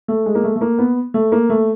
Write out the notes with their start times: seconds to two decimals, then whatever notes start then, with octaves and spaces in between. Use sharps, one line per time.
0.08 A3
0.26 G#3
0.35 A#3
0.44 A3
0.56 A3
0.61 A#3
0.79 B3
1.14 A3
1.32 A#3
1.50 A3